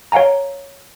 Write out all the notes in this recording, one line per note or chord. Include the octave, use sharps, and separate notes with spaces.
C#5 F5 F#5 G#5 A#5